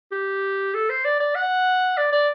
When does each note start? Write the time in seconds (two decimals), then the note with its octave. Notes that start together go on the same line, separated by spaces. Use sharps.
0.12 G4
0.74 A4
0.90 C5
1.05 D5
1.20 D5
1.35 F#5
1.97 D5
2.13 D5